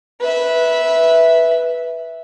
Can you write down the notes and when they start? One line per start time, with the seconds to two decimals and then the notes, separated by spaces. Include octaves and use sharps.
0.21 B4 E5